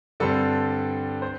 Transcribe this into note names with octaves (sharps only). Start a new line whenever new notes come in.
G2 D3 G3 C4 A4
C5